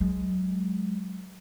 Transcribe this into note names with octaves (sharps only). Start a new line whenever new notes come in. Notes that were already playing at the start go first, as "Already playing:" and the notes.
F#3 G#3